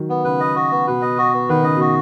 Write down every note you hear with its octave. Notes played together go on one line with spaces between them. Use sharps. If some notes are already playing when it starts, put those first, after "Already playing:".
Already playing: D#3 F#3
B3
C#3 B4
D#5
F#4
B3
B2 B4
D#5
F#4
B3
D#3 B4
C#3 D#5
B2 F#4